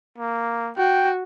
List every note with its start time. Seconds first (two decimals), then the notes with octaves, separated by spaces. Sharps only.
0.18 A#3
0.77 F#4 G5